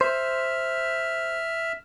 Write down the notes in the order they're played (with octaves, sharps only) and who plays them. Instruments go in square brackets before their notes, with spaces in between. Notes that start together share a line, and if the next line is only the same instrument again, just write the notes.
[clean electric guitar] C5 [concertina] E5 F6